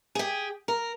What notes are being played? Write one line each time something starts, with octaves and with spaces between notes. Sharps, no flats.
G4 G#4
A#4